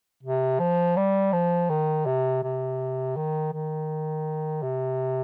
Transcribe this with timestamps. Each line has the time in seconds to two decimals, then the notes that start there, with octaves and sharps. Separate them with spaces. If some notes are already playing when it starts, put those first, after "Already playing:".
0.23 C3
0.59 F3
0.96 G3
1.33 F3
1.70 D#3
2.06 C3
2.43 C3
3.16 D#3
3.52 D#3
4.63 C3